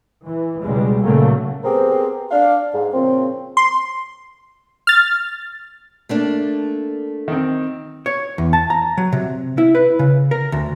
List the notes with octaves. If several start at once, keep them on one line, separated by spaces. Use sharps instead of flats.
E3
C#2 B2 G3 G#3
A#2 C#3 F#3 A3 A#3
B3 C4 G4 G#4 A#4 C5
D4 F5
G#2
A#2 C#3 F3 C4
C6
F6 A6
A3 A#3 D4
D#3 C4
C#5
E2
A5
A#5
F#3
C3
E4
B4
C#3
A#4
D2